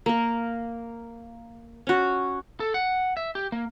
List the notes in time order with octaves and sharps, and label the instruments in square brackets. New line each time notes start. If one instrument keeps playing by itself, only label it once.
[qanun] A#3 A#4
C#4 F#4
[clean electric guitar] A4
F#5
E5
G4
A#3